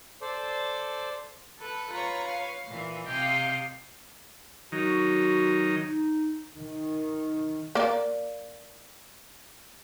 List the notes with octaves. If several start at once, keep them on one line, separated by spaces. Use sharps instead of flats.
A4 C5 D5
A4 B4
F4 B4 C#5 A#5
F5
A#2 E3
C3 D#5 F5 G5
D#3 F#3 D#4 F#4
D#4
D#3
A#3 D5